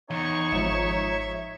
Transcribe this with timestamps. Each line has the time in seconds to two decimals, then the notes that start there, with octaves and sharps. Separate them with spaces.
0.11 E2 D#4 C#5 C#6
0.52 G#1 G#2 F3 E5